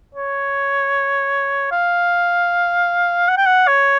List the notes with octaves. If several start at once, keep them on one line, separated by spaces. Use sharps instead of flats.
C#5
F5
F#5
G5
F#5
C#5